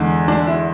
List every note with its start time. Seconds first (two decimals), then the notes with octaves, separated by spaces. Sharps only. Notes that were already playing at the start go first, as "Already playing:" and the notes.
Already playing: E2 D3 G#3
0.28 D4
0.47 E4